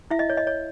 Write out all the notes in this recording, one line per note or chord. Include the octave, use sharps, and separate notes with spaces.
E4 E5
D#5
C#5
D#5
C#5